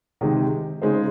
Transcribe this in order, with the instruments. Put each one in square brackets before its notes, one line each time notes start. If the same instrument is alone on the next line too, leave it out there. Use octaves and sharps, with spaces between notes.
[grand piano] C3 D#3 G#3
C#3 G#3 D#4 G#4 C5